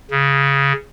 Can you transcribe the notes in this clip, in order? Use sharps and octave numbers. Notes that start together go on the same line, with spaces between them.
C#3